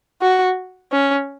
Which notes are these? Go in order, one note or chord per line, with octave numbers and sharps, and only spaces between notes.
F#4
C#4